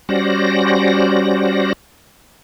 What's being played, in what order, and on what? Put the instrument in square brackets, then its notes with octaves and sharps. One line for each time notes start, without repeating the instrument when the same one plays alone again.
[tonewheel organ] G3 C#4 F#4 C5 D5 A#6